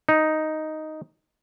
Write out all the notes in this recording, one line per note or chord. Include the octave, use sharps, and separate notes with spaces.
D#4